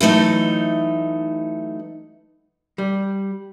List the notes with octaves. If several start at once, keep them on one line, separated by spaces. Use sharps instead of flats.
E3 F#3 A3 D#4
G3